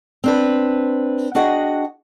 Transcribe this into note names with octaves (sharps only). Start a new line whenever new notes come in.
C4 D4 B4
D4 F#4 G#4 D#5 F#5 G5